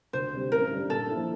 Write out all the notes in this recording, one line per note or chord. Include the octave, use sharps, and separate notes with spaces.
D2 C5
C3 G3 C4
A1 A#4
G2 D3 G3 D4
A#2 A4
F3 A#3 E4